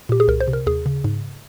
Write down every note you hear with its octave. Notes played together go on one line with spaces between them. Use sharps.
A#2 G4
G#4
C2 A#4
C5
C3
A#4
D#2 G#4
C#3
G#2